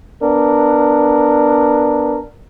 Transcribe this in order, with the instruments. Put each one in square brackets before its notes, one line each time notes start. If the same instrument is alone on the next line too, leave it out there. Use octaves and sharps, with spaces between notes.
[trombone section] B3 D4 A#4